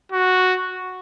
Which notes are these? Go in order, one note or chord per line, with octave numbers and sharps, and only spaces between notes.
F#4